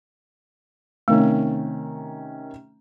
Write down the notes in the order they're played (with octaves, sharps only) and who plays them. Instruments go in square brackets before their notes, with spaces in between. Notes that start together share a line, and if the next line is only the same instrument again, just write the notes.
[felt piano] C3 D#3 C#4 [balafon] A3